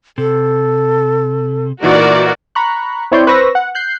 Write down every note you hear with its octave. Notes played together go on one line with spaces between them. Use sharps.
C3 A4
A#2 E3 D#4 F#4 A#4 D5
A#5 B5 C#6 F#6
C4 E4 C#5 D5 C6 G6
B4 C5 C#6 E6 A#6
F#5
F#6 G6 C7